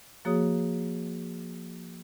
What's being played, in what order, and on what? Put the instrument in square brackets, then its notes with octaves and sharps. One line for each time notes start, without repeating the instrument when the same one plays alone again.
[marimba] F3 A#3 F#4 G#4 C#5 D#6